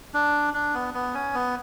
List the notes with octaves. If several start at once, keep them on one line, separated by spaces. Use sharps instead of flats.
D4
D4
B3
B3
C#4
B3